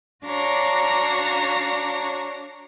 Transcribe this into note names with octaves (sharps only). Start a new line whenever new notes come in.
D4 F#4 C#5 F5 A#5